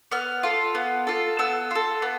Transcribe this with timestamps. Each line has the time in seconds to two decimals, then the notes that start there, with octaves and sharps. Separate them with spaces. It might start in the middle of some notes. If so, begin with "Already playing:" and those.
0.11 B3 F6
0.43 F4 A4
0.75 B3
1.07 F4 A4
1.39 B3 E6
1.71 F4 A4
2.02 B3